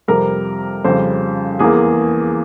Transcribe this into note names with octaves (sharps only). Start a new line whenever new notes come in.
F2 C3 G3 A#4
F2 C#3 G3 C5
E2 E3 A#3 G#4